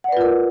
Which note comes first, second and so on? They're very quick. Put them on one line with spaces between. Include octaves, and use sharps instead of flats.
F#5 D5 B4 F4 A#4